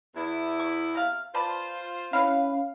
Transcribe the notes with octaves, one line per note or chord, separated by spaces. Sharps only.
E2 E4
C#6
C3 F5
F4 B4 C5 D5 A5
C#4 E4 F#4 B4 F5